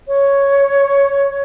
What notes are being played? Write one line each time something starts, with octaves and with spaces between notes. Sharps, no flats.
C#5